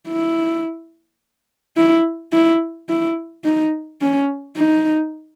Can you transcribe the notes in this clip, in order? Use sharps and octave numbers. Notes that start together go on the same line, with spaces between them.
E4
E4
E4
E4
D#4
C#4
D#4